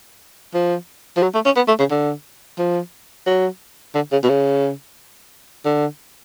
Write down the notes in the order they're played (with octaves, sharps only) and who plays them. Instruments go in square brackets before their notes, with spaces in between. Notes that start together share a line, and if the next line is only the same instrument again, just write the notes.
[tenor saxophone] F3
F3
F#3
A3
C#4
B3
A3
C#3
D3
F3
F#3
D3
C#3
B2
C#3
D3